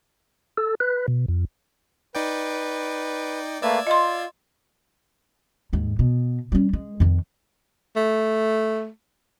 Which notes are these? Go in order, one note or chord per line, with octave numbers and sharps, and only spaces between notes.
A4
B4
B2
F2
D#4 B4 D5 G5
A3 A#3 B4 D5 E6 G#6
F4 D#5 C6
D#2 G#2
B2
G3 C#4
G#3
F2 D#3
A3